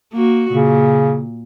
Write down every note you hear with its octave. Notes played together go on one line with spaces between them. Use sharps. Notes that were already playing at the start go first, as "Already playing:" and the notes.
A#3 F#4
A#2 C#3